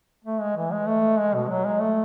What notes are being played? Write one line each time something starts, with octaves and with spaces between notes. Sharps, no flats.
A3
G#3
E3
G#3
A3
G#3
B2
F#3
G#3
A3